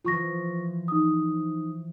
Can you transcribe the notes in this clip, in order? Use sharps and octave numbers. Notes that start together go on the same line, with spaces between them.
E3 F3 F4 C#6 A#6
D#4 D#6